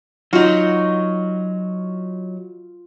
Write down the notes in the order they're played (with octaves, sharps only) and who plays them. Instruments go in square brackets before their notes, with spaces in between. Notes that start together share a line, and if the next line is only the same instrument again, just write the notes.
[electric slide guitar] F#3 [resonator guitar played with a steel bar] D#4 F#4 [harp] F4